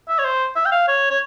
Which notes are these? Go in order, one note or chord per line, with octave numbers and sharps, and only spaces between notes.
E5
C#5
C5
E5
G5
F5
C#5
C#5